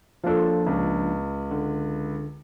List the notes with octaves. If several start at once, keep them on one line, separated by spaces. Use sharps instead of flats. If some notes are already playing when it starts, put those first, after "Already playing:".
F3 A#3 D4 F4 A4
C#2
D3